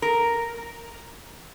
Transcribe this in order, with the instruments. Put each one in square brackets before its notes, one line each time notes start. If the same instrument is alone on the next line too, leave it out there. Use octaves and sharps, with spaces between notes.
[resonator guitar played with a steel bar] A#4